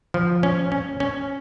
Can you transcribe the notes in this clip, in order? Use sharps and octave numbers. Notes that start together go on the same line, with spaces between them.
F3
C#4
C#4
C#4